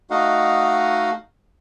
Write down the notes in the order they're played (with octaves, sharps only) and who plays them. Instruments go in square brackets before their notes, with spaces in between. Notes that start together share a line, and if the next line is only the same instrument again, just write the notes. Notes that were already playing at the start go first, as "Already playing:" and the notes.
[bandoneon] A3 D#4 F#4 D#5 F5 F#5